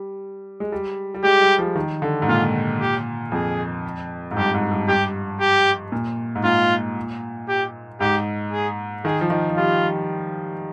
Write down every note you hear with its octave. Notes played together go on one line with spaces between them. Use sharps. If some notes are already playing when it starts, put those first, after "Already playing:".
Already playing: G3
G#3
G3
G3
G#3 G4
G3
F3
D#3
D3
G#2
A#2 F4
G4
F2 G#4
G#2
G2 G4
G#2
G2
G2 G4
G4
A#2
G#2
A#2 F4
G4
G#2 G4
G#4
D#3 G#4
F3
D#3
F3
G3 F4